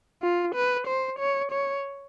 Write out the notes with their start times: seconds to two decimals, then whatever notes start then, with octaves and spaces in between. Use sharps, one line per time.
0.22 F4
0.55 B4
0.87 C5
1.19 C#5
1.52 C#5